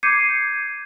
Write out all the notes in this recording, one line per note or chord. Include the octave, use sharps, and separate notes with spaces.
D6 G6 G#6 C7 C#7 D#7